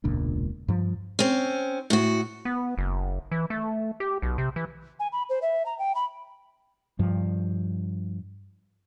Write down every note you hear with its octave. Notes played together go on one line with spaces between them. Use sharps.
E1 C#2 A#2 D4
G2 F3
C4 C#4
A2 F#4
B3
F#1
E3
A3
G4
B1
C3
E3
G#5
B5
C5
E5
A#5
G5
B5
G2 F3